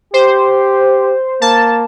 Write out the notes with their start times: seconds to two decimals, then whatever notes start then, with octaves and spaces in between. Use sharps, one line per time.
0.14 G4 C5
1.41 A#3 A5